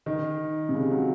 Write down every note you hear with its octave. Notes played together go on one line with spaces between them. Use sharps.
D#3
C3
C#3
F#3